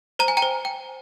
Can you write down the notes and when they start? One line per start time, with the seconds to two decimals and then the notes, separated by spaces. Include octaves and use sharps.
0.19 C5 A#5
0.28 G#5
0.37 G5 A#5
0.42 C5
0.65 G5